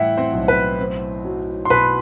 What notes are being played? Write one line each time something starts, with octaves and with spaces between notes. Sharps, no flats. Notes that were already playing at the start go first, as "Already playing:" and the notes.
Already playing: A2 E3 G3 E4 E5 F#5 G5
C4 C5
B1
B4
C4
F#3
C6
B2 B4 B5